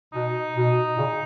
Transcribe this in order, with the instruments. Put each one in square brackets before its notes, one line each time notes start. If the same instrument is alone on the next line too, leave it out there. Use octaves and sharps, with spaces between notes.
[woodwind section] B2 [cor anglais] D#4
[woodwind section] B2
A#2 C#3